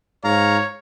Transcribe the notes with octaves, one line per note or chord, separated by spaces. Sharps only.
G#2 C#5 F5 A#5